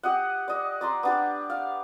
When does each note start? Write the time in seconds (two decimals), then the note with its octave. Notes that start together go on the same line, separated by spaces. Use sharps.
0.03 G4 D#5 F#5
0.48 D5 D#5
0.81 D5 A#5 C6
1.03 B3 D4 G4
1.50 F5